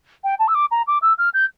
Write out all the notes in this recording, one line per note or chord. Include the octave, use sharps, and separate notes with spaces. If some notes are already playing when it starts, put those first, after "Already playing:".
G5
A5
E6
D6
A#5
D6
E6
F6
G6